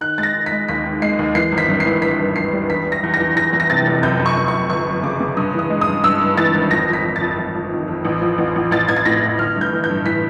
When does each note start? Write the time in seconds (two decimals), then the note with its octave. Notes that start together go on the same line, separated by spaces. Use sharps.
0.01 D#3 F#6
0.18 G#3 A6
0.23 A#6
0.34 D#3
0.46 B6
0.52 G#3
0.69 D#2 B6
0.85 D#3
1.02 G#3 C7
1.19 D#2
1.35 E3 C7
1.52 G#1
1.58 B6
1.69 G2
1.80 C7
1.86 E3
2.02 E3 B6
2.19 G2
2.36 G2 C7
2.53 G3
2.70 E2 B6
2.86 E3
2.92 A#6
3.03 E2
3.14 A#6
3.20 E2
3.36 E2 A#6
3.53 E3
3.60 A#6
3.70 C3 A6
3.86 F1
4.03 F#2 G6
4.19 F#2
4.26 C#6
4.37 F#2
4.48 C#6
4.54 F#2
4.70 G1 C#6
4.87 F#2
5.03 C#3 D6
5.20 C#3
5.37 G2 D#6
5.54 E3 D#6
5.70 G#3
5.81 D#6
5.87 G2
6.04 G2 E6
6.21 G2
6.38 E3 A6
6.54 G#1
6.71 F2 A#6
6.88 F2
6.93 B6
7.04 F2
7.16 A6
7.21 F2
7.38 F2
7.54 F2
7.71 D#3
7.88 F2
8.05 A1
8.22 F3
8.38 A1
8.56 A1
8.71 A1 A6
8.89 A1 G#6
8.96 A6
9.06 A2 A#6
9.22 A2
9.38 G1 F6
9.56 G2
9.61 G6
9.72 E3
9.84 G6
9.90 G2
10.06 E3 B6